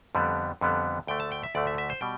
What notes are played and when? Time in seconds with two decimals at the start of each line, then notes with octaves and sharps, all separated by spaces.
0.15 F2 D3 G3 B3
0.61 F2 D3 G3 B3
1.07 D2 D3 A3 G5
1.20 A5
1.32 G5
1.43 E5
1.55 D2 D3 A3 D5
1.67 E5
1.78 E5
1.90 C5
2.01 B2 G3 G5